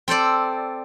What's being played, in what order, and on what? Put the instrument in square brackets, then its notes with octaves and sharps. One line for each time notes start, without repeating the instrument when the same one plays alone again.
[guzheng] C4 A4 C5 D5